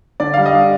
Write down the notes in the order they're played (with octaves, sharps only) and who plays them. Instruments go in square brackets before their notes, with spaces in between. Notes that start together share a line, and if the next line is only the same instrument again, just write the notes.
[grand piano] D3 D5
G3 F5
D#5
D4